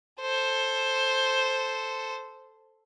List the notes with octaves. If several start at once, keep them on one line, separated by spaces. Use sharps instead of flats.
A4 C5